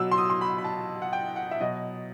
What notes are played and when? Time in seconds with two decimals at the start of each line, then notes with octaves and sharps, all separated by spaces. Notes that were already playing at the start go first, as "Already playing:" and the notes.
Already playing: B2 F#3 E6
0.11 C6
0.18 D#6
0.30 C6
0.41 B5
0.58 B5
0.64 A5
1.02 F#5
1.13 G5
1.36 F#5
1.51 E5
1.60 B2 F#3 D#5